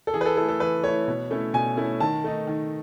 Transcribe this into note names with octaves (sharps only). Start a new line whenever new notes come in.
A4
E3 G#4
B4
A4
A3 E4 A4
A4
E3 B4
A3 E4 C#5
B2
A3 C#4 E4
B2 G#5
A3 C#4 E4
D#3 A5
A3 D#4
D#3